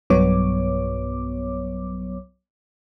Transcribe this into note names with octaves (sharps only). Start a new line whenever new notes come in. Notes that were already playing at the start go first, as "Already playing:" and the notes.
B1 G2 F#3 B3 C#5 D6